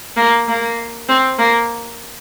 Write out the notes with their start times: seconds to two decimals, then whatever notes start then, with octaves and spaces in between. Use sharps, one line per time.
0.17 A#3
0.48 A#3
1.09 C4
1.39 A#3